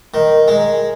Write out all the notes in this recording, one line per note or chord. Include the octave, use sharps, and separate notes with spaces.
D#3
G#3